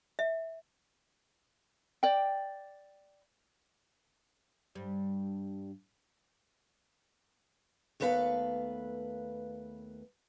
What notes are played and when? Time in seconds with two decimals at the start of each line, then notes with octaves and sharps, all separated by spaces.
0.19 E5
2.03 D5 G5
4.75 G2 G3
8.00 D#2 A3 B3 B4 E5 F5